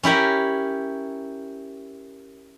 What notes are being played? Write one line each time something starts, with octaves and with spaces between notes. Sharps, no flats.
C#4 E4 G4 A#4